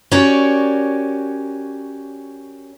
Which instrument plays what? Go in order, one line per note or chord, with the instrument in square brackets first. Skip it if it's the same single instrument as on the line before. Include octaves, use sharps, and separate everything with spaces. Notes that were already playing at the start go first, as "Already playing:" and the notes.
[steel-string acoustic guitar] C#4 F#4 G4 A#4 C#5 D5